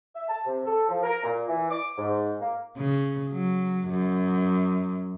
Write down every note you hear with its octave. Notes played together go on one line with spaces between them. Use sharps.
E5
A5
C3
A4
F3
A#4
A#2
E3
D6
G#2
A#3
C#3
F#3
F#2